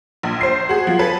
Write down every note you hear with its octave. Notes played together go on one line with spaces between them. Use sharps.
A#1
C5 C7
F#4 G#4
F3
A4 B4